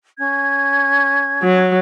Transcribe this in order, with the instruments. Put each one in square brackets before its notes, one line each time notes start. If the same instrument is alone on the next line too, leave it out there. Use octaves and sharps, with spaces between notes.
[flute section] C#4 G#6
[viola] F#3